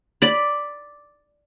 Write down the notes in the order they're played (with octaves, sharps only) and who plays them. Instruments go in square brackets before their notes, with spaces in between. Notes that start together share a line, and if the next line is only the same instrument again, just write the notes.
[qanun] D5 B5